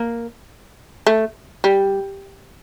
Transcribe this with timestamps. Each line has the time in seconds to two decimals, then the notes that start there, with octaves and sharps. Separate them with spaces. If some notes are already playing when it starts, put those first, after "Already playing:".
Already playing: A#3
1.07 A3
1.64 G3